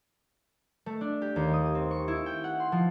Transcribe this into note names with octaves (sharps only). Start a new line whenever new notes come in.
A3
D4
G4
D#2
D#6
C4
C#6
E4
G5
F#5
C6
F3